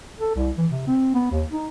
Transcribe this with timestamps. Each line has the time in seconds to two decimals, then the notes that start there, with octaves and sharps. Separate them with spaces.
0.20 A4
0.35 C2
0.58 E3
0.71 C3
0.87 C4
1.14 B3
1.31 D#2
1.51 D#4